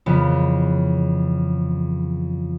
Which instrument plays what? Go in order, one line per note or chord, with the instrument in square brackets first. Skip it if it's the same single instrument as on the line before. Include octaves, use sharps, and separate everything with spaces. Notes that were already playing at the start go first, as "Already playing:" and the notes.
[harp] F2 C#3 E3 B3